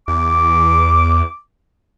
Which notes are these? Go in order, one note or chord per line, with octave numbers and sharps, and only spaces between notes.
E2 D6